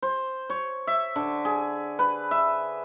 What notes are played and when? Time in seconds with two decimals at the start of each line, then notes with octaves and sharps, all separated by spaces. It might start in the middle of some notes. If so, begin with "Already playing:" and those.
0.03 C5
0.50 C#5
0.87 E5
1.16 D3
1.45 G#4
1.99 B4
2.31 E5